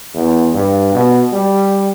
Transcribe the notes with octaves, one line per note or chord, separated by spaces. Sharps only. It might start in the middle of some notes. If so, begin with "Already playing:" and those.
E2
G2
B2
G3